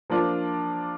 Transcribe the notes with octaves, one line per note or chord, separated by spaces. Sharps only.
F3 A#3 D4 F4